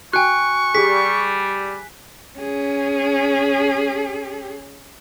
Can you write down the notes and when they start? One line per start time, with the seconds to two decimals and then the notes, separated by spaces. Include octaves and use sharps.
0.13 F#4 G5 G#5 C#6 F#6
0.75 G3 G4 G#4 B6
2.39 C#4 G#4